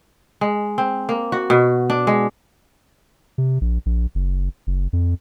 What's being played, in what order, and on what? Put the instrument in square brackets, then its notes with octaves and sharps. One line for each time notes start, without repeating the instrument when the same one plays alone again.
[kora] G#3
C4
A#3
F#4
B2
D4
G#3
[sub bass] C3
A#1
A#1
F#1
F#1
F2